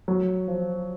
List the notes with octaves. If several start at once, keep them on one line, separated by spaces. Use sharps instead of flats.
F#3
F3